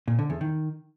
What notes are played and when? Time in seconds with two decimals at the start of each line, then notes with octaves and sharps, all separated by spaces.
0.08 A#2
0.19 D3
0.30 E2
0.41 D#3